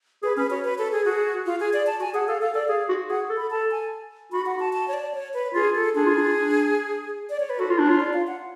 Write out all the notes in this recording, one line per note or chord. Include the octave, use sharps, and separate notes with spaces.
G#4 B4
C#4 B4
F#4 C#5
B4
A4
G#4
F#4 G#4
F4
G#4
D5
A5
F#4 G#5
G#4 F#5
A4 F5
A4 F5
A4 D5
G#4 F5
F#4
G#4 F#5
A4
B5
A4 A5
G#5
F#4 B5
F#5
A5
A5
C#5
D5
C#5
B4
F4 G#4
A4
D4 G#4
F4
D4
D4
D5
C#5
B4
F#4 A4
F4
D4
F4 C#5
D5
F5
F#5